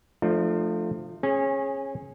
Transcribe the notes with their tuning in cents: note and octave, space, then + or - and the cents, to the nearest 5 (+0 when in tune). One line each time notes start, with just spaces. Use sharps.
F3 +0 A3 +0 D4 +45
C#4 -25 G#4 +0